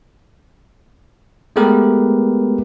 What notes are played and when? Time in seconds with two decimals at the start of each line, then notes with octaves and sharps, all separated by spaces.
1.56 G#3 A3 B3 G4 A#4 B4